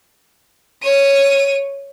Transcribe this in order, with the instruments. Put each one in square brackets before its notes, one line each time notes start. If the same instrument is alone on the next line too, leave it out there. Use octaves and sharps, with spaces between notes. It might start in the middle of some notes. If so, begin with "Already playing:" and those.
[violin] C#5 D#7